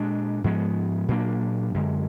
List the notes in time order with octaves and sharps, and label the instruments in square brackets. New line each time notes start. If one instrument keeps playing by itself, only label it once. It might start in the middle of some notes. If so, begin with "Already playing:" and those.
Already playing: [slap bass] A#2 G#3 D4
G#2 F3 G#3 B3
A#2 F#3 A#3 D4
F#2 D3 G#3